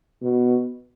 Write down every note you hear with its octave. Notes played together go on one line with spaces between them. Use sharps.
B2